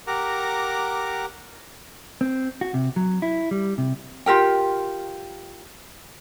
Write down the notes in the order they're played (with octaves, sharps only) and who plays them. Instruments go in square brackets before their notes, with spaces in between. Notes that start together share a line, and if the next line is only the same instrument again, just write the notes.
[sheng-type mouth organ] G4 A#4 F#5 A#5 D6
[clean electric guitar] C4
F#4
C3
F#3
E4
G3
C3
[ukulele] F4 G4 A#4 G5